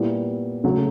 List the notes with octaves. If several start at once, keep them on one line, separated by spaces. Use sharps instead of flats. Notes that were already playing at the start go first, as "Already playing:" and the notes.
Already playing: A#2 G3 B3 E4
C#3 F#3 A3